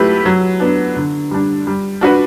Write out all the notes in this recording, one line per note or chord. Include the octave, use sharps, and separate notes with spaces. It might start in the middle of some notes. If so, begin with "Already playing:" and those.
Already playing: F#3 A3 E4 G4 B4
F#3
B3 D4
D3
G3 D4
G3
D4 F#4 B4